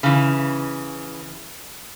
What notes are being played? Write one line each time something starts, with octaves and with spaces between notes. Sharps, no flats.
C#3 E3